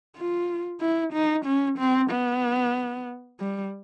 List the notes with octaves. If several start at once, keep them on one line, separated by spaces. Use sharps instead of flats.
F4
E4
D#4
C#4
C4
B3
G3